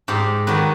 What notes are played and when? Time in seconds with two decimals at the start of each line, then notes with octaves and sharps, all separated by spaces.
0.08 G#2 G4
0.47 D#3 F#3 B4